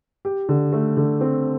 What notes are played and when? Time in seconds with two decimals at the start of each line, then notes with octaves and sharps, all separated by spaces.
0.25 G4
0.49 D3
0.73 A3
0.97 D3
1.21 C4